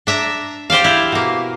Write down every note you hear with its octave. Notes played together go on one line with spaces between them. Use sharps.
D4 E5 A#5
G4 C5 D5 F5
E4
B2 A#3